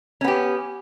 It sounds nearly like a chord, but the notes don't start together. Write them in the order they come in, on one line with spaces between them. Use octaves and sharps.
C#4 B3 G4